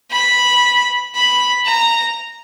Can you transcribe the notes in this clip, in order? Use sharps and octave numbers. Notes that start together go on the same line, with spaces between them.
B5
B5
A#5